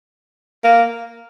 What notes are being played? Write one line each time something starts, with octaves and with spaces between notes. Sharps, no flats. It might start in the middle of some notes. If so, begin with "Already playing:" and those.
A#3